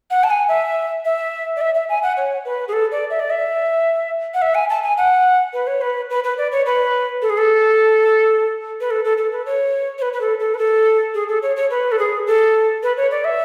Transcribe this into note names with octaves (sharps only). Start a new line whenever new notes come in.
F#5
A5
G#5
E5
E5
D5
E5
E5
G#5
F#5
C#5
B4
G#4
A4
D5
E5
D5
E5
F#5
E5
G#5
A5
G#5
F#5
B4
C#5
B4
B4
B4
D5
C#5
B4
A4
G#4
A4
B4
A4
A4
A4
B4
C#5
C#5
B4
B4
A4
A4
B4
A4
G#4
A4
C#5
C#5
B4
A4
G#4
A4
B4
C#5
D5
E5